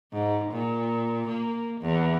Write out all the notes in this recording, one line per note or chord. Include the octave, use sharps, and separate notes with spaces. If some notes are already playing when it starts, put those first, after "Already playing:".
G#2
A#2
A#3
E2